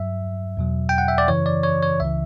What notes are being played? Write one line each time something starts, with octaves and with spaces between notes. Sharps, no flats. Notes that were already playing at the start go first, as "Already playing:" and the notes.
Already playing: G2 F#3 E5
E2 B2 F#3
G5
F#5
E5
D5
F#2 C#3 E3 C#5
D5
C#5
C#5
C#2 C#3 E3 E5